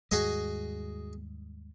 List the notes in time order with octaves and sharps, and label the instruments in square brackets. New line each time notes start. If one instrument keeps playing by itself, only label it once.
[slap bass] D#2 G#2 G3 [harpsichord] F#4 G#4 D#5